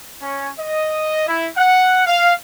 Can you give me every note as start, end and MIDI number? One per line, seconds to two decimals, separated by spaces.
0.22 0.49 61
0.59 1.27 75
1.27 1.47 64
1.56 2.06 78
2.06 2.34 77